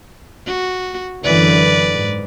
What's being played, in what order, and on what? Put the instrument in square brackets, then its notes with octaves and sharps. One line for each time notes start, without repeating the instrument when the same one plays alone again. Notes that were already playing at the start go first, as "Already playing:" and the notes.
[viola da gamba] F#4
[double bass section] F#2 D3 E3 [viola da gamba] B4 D5
[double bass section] G#2